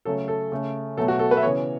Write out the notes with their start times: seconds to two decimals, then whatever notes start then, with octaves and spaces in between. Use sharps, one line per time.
0.05 C#3 F#3 A3 A4
0.28 A4
0.52 C#3 A3
0.97 B2 F#3 A3 A4
1.08 F#4
1.19 A4
1.31 B4
1.37 E5
1.43 C#3 E3 B3 C#5